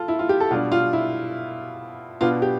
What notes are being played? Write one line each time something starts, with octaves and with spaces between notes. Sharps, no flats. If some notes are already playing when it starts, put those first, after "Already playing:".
Already playing: F4 A4
E4
F4
G4
A4
B2 G3 D4 F4
F4
E4
B2 B3 D4 F4
G4